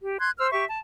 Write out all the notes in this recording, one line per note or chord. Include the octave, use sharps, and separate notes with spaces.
G4
C6 F#6 G#6
C5 E6 F6
G4 E5 C#6
A5